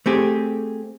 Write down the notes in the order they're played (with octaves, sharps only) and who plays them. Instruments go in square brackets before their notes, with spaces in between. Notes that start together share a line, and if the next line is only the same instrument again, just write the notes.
[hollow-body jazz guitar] A3 C4 G4 G#4